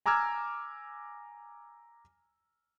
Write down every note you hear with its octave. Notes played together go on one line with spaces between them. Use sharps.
G#5 A#5 D6 E6 F6 G#6